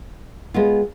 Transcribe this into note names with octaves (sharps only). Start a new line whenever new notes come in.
G#3 B3 F4